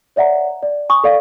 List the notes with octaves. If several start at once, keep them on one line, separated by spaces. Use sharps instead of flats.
C#5 D5 E5 F#5 A#5
D5
G#5 C#6 D#6
A4 D5 F5